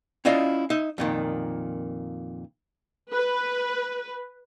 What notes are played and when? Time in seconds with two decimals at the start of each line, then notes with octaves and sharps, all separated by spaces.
0.25 C#4 E4 F4 D5 D#5
0.70 D#4 E5
0.98 F2 A#2 D#3
3.12 B4